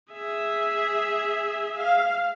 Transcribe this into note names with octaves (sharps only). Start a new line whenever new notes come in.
G#4 E5
F5